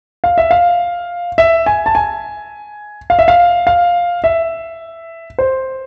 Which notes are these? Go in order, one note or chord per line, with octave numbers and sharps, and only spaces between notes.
F5
E5
F5
E5
G#5
A5
G#5
F5
E5
F5
F5
E5
C5